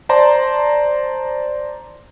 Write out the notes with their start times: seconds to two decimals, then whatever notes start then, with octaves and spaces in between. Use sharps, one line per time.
0.09 C5 D5 A5 A#5 C6